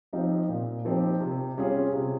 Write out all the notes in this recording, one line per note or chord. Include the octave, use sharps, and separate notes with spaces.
F3 C4 D#4 G4
A#2
F3 C4 D#4 G4
C3
G3 C#4 F4 G#4
C3